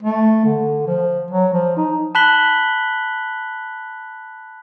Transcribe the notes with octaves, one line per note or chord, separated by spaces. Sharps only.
A3
D3
F3
F#3
F3
D#4
A5 B5 F#6 B6 F#7 G7